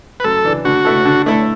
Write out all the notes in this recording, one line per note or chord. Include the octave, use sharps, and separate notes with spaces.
B4
F#2 A4
E3 D4
D3 F#4
A3 E4 A4
D3
A3 E4 A4